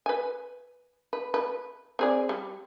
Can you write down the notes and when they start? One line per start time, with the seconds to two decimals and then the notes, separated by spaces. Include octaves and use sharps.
0.06 B4 G#5
1.13 B4
1.34 B4
1.99 C4 G#4 D5
2.29 G3